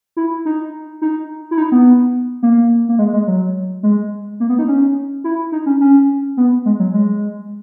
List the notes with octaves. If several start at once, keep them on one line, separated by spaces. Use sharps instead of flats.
E4
D#4
D#4
E4
D#4
B3
A#3
A#3
G#3
G#3
F#3
G#3
A#3
B3
D#4
C#4
E4
D#4
C#4
C#4
B3
G#3
F#3
G#3